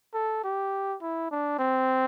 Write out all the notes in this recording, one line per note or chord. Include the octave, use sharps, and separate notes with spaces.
A4
G4
E4
D4
C4